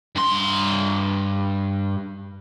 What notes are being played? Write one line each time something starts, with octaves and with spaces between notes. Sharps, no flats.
G2 C6